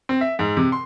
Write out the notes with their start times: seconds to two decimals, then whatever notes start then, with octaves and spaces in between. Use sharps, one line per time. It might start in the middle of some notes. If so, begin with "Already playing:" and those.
0.09 C4
0.21 E5
0.39 G#2
0.57 C3
0.72 C6